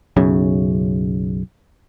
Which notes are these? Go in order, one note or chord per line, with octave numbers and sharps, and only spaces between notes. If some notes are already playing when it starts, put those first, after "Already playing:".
B1 F#2 C#3